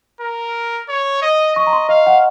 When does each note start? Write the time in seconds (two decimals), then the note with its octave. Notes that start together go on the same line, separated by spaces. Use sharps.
0.21 A#4
0.89 C#5
1.22 D#5
1.56 D#5 C#6
1.67 A#5
1.73 C6
1.89 D#5 F5
2.07 F#5